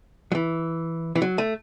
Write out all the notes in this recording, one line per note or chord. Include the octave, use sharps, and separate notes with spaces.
F#3
E3
E3
F#3
A3